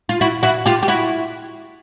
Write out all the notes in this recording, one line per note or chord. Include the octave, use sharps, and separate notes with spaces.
F4
E4 F#4
E4 F#4
F4 G4
G4
E4 F#4